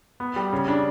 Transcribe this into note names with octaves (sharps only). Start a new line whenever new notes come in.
B3
G3
C#3
D4